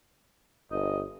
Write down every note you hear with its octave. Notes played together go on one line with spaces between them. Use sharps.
G1 D#5